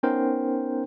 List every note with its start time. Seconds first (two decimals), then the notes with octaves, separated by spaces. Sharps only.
0.03 B3 C#4 D#4 A#4 C5 G5